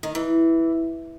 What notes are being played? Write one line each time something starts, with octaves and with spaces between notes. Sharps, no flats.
D#3
E3